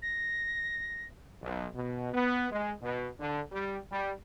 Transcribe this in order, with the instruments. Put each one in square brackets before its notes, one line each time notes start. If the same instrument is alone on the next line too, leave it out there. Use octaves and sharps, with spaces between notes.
[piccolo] A#6
[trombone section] B1
B2
B3
G#3
B2
D3
G3
G3